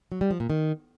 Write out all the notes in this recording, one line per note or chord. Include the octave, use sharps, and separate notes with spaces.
F#3
G3
F3
A#2
D#3